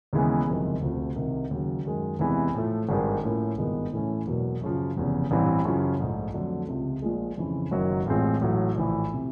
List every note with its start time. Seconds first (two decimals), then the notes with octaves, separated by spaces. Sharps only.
0.13 D#2 C#3 E3 G#3 B3
0.47 F#1 F2 C3 D#3 G#3
0.81 D2 C3 F3 A3
1.16 C2 C3 D#3
1.51 D#2 C#3 F#3
1.85 F#2 D#3 G#3
2.19 E2 C3 E3 G#3
2.54 A2 F3 A3
2.89 G#1 G2 D#3 G#3
3.23 A2 F3 A#3 C#4 E4
3.58 G#1 G2 D#3 G#3 B3
3.93 A2 E3 A3 C#4
4.27 E1 E2 B2 F#3 A#3
4.62 F#2 C#3 F3
4.96 F1 E2 C#3
5.31 A1 G2 E3 G3 C4
5.65 F#2 C#3 F3
6.00 A#1 G#2 F3 A3
6.34 F2 D3 F#3 A3
6.68 C#2 C3 F3
7.02 A#1 A#2 F3 G#3
7.38 F2 C#3 E3
7.71 F#1 F#2 D#3 F#3
8.06 A1 A2 F3 G#3 C4
8.41 A1 A2 F#3 A3
8.76 A#1 A2 E3
9.14 C3